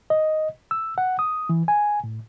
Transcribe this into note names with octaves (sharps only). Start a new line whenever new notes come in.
D#5
E6
F#5
D#6
E3
G#5
A2